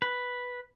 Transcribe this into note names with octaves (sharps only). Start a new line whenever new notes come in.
B4